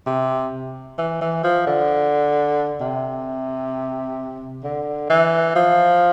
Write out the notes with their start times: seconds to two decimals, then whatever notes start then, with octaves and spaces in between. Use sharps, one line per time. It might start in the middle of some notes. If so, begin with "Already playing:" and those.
0.07 C3
0.98 E3
1.21 E3
1.44 F3
1.67 D3
2.81 C3
4.64 D3
5.10 E3
5.55 F3